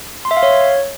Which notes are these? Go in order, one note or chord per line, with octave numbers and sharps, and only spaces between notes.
C6
E5
F5
C#5